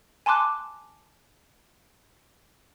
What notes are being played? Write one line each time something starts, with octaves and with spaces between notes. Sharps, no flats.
G#5 A5 C6 D6 F#6